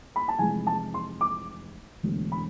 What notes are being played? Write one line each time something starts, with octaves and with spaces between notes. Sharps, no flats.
B5
A5
F1 F2 C3 E3 G#3 G#5
A5
C6
D6
E1 D2 D3
B5